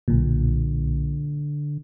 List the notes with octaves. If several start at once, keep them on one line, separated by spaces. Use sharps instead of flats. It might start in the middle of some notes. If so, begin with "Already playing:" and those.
B1 A#2 D3